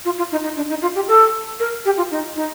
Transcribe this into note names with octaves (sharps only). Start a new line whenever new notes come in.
F4
F4
D#4
D#4
D4
D#4
F4
G4
A4
A#4
G4
F4
D#4
D#4